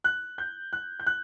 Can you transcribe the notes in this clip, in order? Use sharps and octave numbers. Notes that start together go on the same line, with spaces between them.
F#6
G6
F#6
G6
F#6